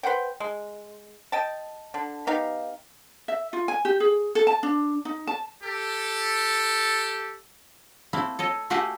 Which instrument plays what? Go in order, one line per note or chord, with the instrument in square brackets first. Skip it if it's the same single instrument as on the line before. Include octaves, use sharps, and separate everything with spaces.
[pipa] B4 C5 F#5 G5
G#3
D#5 G5 A5
D3
B3 D#4 G4 F5
[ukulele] E5
F4
G#5
G4
G#4
A4
A5
D4
D#4
A5
[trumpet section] G4 A4
[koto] A3 A#3 C4 E4
A4 C#5 D#5
A3 F#4 G4 F5 F#5 G#5